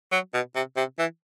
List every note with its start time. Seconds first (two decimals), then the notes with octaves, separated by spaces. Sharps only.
0.12 F#3
0.34 B2
0.55 C3
0.77 C3
0.98 E3